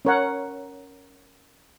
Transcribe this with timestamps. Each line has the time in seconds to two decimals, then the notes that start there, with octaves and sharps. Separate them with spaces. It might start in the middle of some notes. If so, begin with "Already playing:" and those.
0.05 C#4 A#4 C#5 F#5